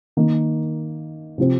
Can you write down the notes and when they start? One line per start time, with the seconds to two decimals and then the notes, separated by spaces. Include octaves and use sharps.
0.17 D#3 A#3
1.38 C3 F3 C4